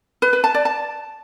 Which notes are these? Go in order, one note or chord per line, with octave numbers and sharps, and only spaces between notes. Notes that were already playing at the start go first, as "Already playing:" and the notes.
B4
B4
A5
D5
A5